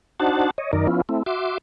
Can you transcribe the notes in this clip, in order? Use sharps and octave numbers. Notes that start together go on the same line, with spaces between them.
D4 D#4 F#4 C5 F#5 A5
C#5 D#5
F#2 D#3 D#4 A#4 D5
F3 B3 C#4 E4 F4
A3 C4 E4
F#4 E5 C6 D6